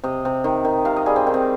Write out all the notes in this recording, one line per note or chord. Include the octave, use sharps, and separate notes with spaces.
C3 D#5
C3
D#3
D#3
C3 F5
D#5
G3 G#4
C4
D#3
C4